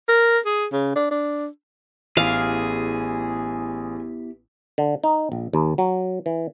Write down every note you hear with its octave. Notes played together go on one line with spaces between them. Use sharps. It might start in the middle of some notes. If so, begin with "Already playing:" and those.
A#4
G#4
C#3
D4
D4
A1 B3 E4 G4 G#4 F5
D3
D#4
A#1
D#2
F#3
E3